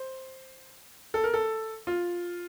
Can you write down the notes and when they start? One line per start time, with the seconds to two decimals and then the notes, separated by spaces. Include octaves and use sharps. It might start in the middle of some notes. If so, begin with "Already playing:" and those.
Already playing: C5
1.14 A4
1.24 A#4
1.34 A4
1.87 F4